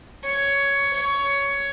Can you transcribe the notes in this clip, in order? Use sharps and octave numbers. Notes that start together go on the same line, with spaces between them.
C#5
C#5